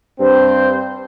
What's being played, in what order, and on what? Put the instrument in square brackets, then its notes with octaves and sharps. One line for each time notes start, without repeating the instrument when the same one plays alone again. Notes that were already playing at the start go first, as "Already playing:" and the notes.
[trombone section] G2 C4 [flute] C5